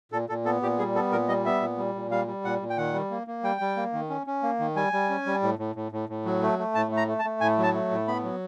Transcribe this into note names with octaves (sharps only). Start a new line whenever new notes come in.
A#2 A4
A#2 A4
B3 A4
A#2 G4
G3 G#4
B3 A4
A#2 A#4
G3 D#5
B3 E5
A#2
G3
A#2
G3 F5
G3
A#2 F#5
A#2
G5
D#3 F#5
G3
A#3
A#3
G3 G5
G3
A#3
D#3
C#4
C#4
A#3
D#3
G3 G#5
G3
C#4
G3
A2
A2
A2
A2
A2
F#3
A3
A3
A2 A5
A3
A#5
A3
A5
A3
A2 G#5
F#3 A5
A3
A2
B3 B5
F#3